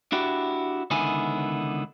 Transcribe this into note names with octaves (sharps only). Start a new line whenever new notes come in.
D4 E4 F#4 G4
C#2 D3 D#3 B3 E4 G#5